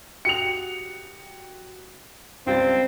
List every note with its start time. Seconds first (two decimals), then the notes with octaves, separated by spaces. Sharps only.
0.25 F#4 G4 G5 C#7 F7
2.47 C#2 G3 C4 A6